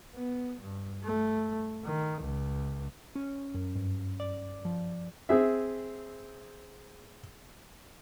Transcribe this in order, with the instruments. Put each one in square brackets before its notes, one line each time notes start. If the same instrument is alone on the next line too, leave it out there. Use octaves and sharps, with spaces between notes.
[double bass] B3
G2
A3
D#3
C#2
[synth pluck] C#4
F#2
G2
D5
F3
[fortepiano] C4 G#4 E5